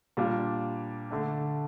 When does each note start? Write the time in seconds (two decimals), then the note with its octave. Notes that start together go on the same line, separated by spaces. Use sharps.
0.17 A#2 G3 D4 F4
1.11 D3 A3 D4